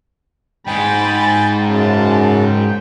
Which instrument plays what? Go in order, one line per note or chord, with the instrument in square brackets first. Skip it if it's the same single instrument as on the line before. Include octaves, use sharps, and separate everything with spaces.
[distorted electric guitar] G#2 G#3 [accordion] G5 G#5 [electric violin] B5 A6
[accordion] F#2 C#3 [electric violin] A5
[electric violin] G5